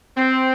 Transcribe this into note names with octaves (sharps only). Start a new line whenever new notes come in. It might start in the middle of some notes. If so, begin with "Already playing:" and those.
C4